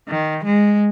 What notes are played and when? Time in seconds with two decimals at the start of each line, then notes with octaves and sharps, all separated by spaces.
0.09 D#3
0.45 G#3